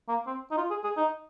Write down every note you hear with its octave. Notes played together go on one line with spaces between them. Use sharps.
A#3
C4
D#4
F4
G#4
G#4
D#4